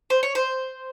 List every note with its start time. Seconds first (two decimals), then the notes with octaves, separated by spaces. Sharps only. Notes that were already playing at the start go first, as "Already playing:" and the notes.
0.10 C5
0.23 C#5
0.35 C5